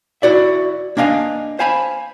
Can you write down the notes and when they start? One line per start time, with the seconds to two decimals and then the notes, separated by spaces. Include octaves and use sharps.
0.22 E4 F#4 D5 E5
0.97 A#3 D4 D#5 F5 G#5
1.59 C5 F5 G#5 A5 B5